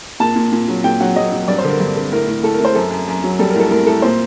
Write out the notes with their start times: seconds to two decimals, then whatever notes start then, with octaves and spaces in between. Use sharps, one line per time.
0.20 A#2 A5
0.36 A#2
0.52 A#2
0.68 F#3
0.84 A#2 G5
1.00 F#3 F#5
1.16 F#3 D#5
1.32 F#3
1.48 G2 D5
1.59 C5
1.64 D3
1.70 A#4
1.80 G2
1.96 D3
2.12 A2 A#4
2.27 A2
2.43 A2 A4
2.54 A#4
2.60 A2 C5
2.75 F#2 A4
2.91 F#2
3.08 F#2
3.24 F#3
3.39 G3 A4
3.50 A2 A#4
3.60 A4
3.71 A2 A#4
3.86 A2 A4
4.02 A#2 C5